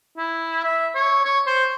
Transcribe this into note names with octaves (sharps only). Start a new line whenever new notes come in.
E4
E5
C#5
C#5
C5